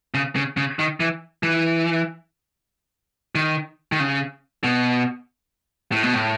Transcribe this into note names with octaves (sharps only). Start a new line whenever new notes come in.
C#3
C#3
C#3
D#3
E3
E3
D#3
D#3
C#3
B2
A2
B2
A2